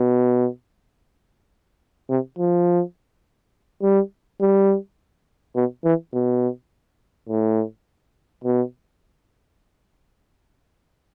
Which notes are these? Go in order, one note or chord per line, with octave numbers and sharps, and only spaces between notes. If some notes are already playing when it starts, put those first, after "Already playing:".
Already playing: B2
C3
F3
G3
G3
B2
E3
B2
A2
B2